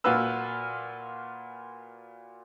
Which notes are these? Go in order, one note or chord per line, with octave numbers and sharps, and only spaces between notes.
A#2 F4 F#4 B4 E6